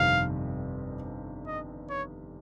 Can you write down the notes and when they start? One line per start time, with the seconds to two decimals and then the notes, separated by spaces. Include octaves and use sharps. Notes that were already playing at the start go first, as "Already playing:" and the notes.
Already playing: G1 F2 C3 D#3 G3 F5
1.47 D#5
1.90 C#5